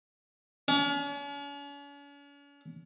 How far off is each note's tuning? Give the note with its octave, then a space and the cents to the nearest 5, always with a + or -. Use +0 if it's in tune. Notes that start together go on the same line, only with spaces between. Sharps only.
C#4 +45